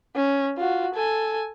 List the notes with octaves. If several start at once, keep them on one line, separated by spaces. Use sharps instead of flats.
C#4
F4 F#4
A4 G#5